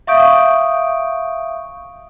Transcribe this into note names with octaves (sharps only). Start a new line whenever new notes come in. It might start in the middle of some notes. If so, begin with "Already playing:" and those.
E5 F5 C#6 D#6 G6 D7